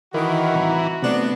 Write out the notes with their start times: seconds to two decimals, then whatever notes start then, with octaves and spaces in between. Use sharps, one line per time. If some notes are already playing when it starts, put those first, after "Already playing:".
0.14 D#3 E3 F#4 A#4
0.54 C2 A2 A#5
1.02 C3 A3 B3 D4